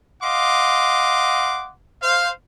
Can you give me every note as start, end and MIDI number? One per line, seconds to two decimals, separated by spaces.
0.22 1.70 75
0.22 1.70 77
0.22 1.70 78
0.22 1.70 84
0.22 1.70 86
2.02 2.30 72
2.02 2.30 77